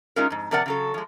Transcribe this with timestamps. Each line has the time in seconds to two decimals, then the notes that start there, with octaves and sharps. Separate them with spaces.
0.16 G#3 C#4 D#4 F4 G#4 A#4
0.30 F2 G#2
0.51 C3 F3 A#4 D5 F#5
0.66 C#3 F#3 A4
0.94 F3 G#3